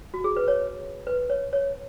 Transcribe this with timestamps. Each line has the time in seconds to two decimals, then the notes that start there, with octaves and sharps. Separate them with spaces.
0.14 F#4
0.24 G#4
0.37 B4
0.48 C#5
1.07 B4
1.30 C#5
1.53 C#5